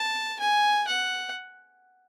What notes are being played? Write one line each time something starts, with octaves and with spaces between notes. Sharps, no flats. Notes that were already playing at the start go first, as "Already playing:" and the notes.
Already playing: A5
G#5
F#5